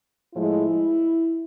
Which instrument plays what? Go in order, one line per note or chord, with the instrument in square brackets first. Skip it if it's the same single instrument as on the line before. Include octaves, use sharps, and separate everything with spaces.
[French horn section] A2 F3 G#3 E4